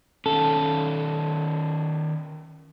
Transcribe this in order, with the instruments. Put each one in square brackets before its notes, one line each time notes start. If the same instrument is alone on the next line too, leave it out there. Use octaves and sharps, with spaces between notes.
[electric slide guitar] D#3 C#4 [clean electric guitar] A4